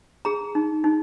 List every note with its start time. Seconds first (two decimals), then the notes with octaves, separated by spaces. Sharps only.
0.25 G#4 A#5
0.55 D#4
0.84 D#4